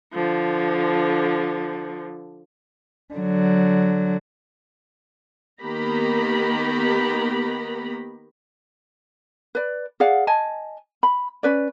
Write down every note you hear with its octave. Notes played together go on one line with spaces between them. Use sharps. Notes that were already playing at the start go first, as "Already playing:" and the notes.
D3 F3
D3 F#3
D#3 A#3 B3 G4 A#5 B5
B4 D5
G#4 D5 F5 F#5
D#5 G#5 A5
B5
C#4 B4 D5